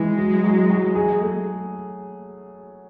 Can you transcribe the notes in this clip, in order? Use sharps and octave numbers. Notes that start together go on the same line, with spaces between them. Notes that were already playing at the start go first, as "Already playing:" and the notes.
Already playing: E3 G#3
F#3
F#3
F#3
G#4
A3